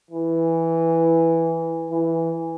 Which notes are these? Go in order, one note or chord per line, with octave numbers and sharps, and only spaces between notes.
E3
E3